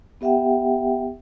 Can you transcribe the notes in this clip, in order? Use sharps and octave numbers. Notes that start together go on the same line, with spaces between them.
B3 G4 E5 F#5 G5